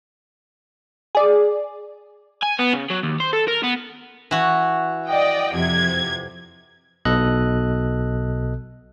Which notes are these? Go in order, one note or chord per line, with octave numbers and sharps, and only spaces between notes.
G#4 D5
G#5
B3
C#3
F#3
D#2
C5
A4
A#4
B3
E3 F#4
D5 D#5 G5
F2 C3 G#6
B1 B2 A4 D#5 F#6